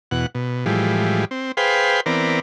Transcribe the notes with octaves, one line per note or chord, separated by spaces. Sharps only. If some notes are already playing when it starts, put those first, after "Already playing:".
E2 B2 F#5
B2
A2 E3 F3 G3 G#3
C4
G#4 B4 C5 F5 G5
E3 B3 C4 A#4 D5